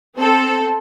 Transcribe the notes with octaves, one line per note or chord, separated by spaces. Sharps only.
C4 A4